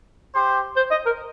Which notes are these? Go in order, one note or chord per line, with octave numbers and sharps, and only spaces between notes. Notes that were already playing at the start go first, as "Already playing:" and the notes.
G4 C5
C5
D#5
A#4